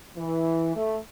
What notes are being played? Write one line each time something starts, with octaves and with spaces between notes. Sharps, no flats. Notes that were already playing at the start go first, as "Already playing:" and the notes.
E3
A3